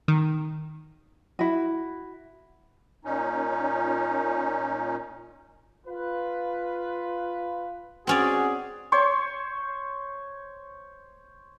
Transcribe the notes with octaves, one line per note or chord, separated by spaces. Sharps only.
D#3
E4 F#4
A#2 C#4 D#4
F4 B4
C4 C#4 F#4 G#4 D5
C5 C#5 C6 C#6